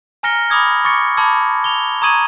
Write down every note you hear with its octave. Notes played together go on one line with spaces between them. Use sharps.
G#5 A#5 F6 A#6 C#7 G7
B5 D6 D#6 G#6
C#6 D6 A6 C#7
A5 B5 C6 D6 E6 G#6
F7 G7
A#5 C#6 D#6 G#6 D#7 F#7